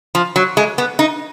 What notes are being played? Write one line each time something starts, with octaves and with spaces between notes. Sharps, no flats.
F3
F#3
G#3
B3
D#4